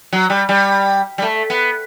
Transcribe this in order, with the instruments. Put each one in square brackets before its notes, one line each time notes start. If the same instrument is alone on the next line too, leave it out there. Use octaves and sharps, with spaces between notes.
[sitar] F#3
G3
G3
G3
A3
B3